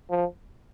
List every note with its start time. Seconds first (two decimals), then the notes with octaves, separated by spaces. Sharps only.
0.10 F3